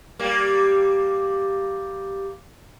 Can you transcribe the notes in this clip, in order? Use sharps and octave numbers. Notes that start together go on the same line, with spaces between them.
G3 A#3